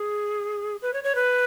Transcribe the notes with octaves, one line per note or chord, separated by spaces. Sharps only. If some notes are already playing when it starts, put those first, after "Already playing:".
Already playing: G#4
B4
C#5
C#5
B4